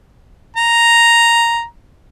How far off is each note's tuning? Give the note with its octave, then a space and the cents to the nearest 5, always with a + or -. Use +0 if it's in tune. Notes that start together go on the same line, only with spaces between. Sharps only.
A#5 +0